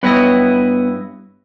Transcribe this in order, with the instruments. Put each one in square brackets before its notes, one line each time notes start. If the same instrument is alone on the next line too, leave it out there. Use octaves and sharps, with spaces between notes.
[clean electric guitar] G2 E4 D#5 [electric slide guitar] B3 B4 C#5